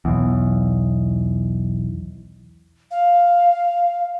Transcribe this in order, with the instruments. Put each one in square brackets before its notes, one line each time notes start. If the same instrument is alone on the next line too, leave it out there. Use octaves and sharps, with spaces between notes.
[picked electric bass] B1 E2
[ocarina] F5